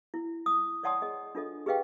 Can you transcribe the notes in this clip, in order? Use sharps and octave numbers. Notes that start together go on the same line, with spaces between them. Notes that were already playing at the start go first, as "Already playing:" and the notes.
E4
D#6
C#5 D5 F#5 A5 C6 D#6
G#4 D#5
D4 F4 A4 D#5
G4 G#4 B4 D#5 F5 G5